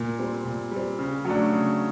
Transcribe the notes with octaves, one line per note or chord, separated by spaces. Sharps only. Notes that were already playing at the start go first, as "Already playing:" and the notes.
Already playing: A#2
G3 C4
A#2
G3
C4
C#3
F#3 A3 D4
C#3